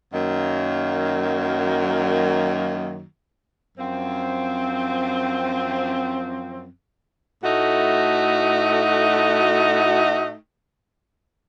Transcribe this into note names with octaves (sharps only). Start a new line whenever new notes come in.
F#2 D#3 F#3 A#3
F#2 F3 C4
A2 A3 D#4 F#4